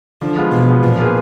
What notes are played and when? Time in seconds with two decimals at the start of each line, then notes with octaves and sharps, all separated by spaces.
0.21 D3 F3
0.37 G#3 B3 F4
0.52 B2 F3
0.68 G#3 B3 F4
0.83 A#2 F3
0.98 A#3 F4 G#4 B4